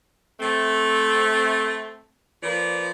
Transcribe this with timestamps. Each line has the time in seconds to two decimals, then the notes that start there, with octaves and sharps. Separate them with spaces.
0.40 A3 C4
2.43 F3 A#3 B4 D5